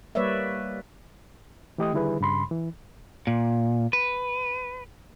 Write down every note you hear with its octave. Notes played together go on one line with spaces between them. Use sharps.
G3 A#3 B4 C#5 D5 E5
E3 A3 G4 D#5 G5 D#6
D3 D#3 G3 E4 G#4 B4
G2 C#3 B5 C6
E3
A#2
B4